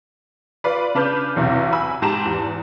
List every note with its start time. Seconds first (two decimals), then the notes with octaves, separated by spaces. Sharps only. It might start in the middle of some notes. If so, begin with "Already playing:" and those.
0.64 F4 B4 D5
0.95 C#3 D4 B4 D6 F6 G6
1.36 B1 E2 C3
1.72 G#5 B5 E6
2.02 G#2 G4 A5 A#5 E7
2.26 E2